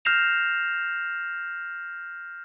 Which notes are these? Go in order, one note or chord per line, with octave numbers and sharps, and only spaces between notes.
F6 G6 A#6 C7 E7 F7